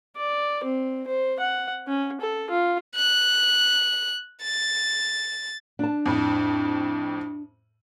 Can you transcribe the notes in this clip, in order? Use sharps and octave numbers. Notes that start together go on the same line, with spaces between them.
D5
C4
C5
F#5
C#4
A4
F4
F#6
A6
D4 A5
F2 A2